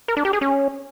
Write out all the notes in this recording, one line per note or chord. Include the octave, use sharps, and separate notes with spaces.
A#4
D4
G4
G#4
C#4